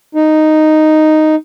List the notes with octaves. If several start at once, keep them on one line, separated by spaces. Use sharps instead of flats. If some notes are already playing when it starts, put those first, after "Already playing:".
D#4